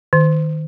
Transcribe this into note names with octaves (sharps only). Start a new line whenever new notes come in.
D#3